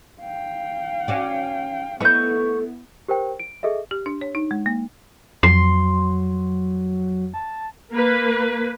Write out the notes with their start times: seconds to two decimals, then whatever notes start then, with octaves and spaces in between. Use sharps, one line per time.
0.21 F5 G5
1.08 C#4 F#4 D5
2.00 A3 B3 E4 B4 D#5 C#6 G6
3.08 G4 A#4 C5 G5
3.40 D7
3.63 G#4 A4 D#5 E5
3.91 G4
4.06 D4
4.21 C#5
4.35 D#4
4.51 G#3
4.66 A#3
5.43 F2 F#3 C6
7.34 A5
7.94 A#3 B4